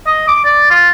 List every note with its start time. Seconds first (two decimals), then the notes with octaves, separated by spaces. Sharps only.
0.07 D#5
0.28 D6
0.44 D5
0.70 F4